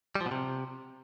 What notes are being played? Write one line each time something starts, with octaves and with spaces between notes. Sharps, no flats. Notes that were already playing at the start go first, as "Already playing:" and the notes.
G3
F3
B2
C3